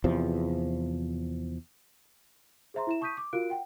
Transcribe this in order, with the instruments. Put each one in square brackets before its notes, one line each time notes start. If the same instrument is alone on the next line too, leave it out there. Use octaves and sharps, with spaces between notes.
[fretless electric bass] E2 C3 F3
[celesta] G#4 C5 E5 A#5 C6
E4 E5 E7
A5 C#6 D#6 G6 B6 D#7
D6
F4 F#4 A#4 F5 F#6 D7
F#5 G5